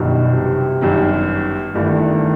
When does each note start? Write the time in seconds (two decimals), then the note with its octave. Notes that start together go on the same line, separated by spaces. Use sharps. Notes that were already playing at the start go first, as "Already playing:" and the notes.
Already playing: G1 F#2 B2 D#3 G3
0.34 C3
0.81 G1 F#2 D#3 G3
1.74 G1 G2 D#3 E3 A3